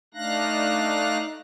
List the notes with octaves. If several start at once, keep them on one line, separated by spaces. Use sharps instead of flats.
A3 D4 D#4 F5 F#6 A#6